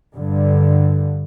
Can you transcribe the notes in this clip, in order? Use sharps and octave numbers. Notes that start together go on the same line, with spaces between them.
G2 D3